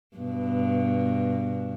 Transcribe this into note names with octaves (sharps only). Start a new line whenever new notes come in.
G2 B2